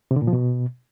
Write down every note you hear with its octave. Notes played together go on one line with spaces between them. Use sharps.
C3
D3
A#2
F3
B2